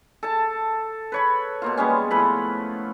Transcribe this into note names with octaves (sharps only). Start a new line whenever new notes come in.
A4 A5
B4 C#5 B5
B2 A#3 F4
G3 G#3 B3 C#4
A2 F3 B4 B5